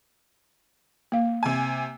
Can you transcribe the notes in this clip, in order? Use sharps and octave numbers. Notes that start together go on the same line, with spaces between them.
A#3 F5
C3 G#5